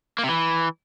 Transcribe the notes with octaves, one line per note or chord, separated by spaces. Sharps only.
A#3
C3
E3